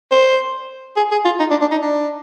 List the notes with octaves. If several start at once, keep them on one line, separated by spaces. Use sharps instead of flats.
C5
G#4
G#4
F4
D#4
D4
D4
D#4
D4